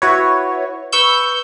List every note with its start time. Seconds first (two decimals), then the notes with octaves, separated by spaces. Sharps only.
0.02 E4 F#4 B4 C#5
0.92 B4 C#6 E6 G6